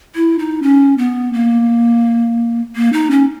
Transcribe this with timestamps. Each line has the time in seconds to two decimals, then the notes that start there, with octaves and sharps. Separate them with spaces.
0.15 E4
0.39 D#4
0.63 C#4
0.98 B3
1.33 A#3
2.76 A#3
2.93 D#4
3.11 C#4